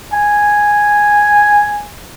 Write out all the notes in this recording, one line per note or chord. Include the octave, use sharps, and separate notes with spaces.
G#5